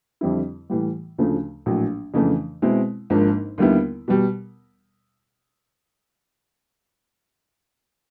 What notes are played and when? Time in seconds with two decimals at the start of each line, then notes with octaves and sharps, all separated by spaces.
0.21 F2 D3 G3 C4 E4
0.70 A2 E3 G3
1.18 D2 C#3 F3 A3 D4
1.66 A#1 A2 F#3
2.14 F2 C#3 E3 A3 D4
2.62 B2 G#3 C4 E4
3.10 G#1 G#2 F3 A#3 D4
3.58 D#2 D3 G3 B3 E4
4.08 B2 G3